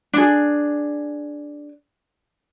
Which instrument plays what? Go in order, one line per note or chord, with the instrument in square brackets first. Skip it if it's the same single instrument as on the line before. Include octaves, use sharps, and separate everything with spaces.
[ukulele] D4 G#4